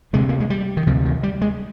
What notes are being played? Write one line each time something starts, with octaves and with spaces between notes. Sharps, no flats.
D2 C3 G#3
A#3
G#3
G3
D#3
D2 C3 F3
D#3
G3
G#3